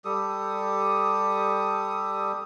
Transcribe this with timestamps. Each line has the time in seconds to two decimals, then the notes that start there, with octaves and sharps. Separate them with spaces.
0.05 G3 G4 A4 D#6